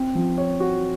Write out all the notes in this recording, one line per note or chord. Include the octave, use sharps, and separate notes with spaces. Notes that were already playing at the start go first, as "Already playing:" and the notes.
Already playing: C4
F3
C#5
F#4